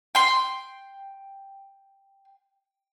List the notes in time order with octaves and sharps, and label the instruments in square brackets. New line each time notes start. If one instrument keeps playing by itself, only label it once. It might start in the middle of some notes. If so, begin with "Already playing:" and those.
[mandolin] G5 C6